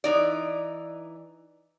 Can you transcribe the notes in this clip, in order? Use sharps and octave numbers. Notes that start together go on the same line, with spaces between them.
E3 D#4 D5